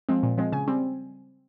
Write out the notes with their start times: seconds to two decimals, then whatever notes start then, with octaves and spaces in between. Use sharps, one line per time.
0.09 F3 G#3 C4
0.23 A#2
0.38 F3 G#3 C4
0.52 C#3 G#5
0.68 G3 C4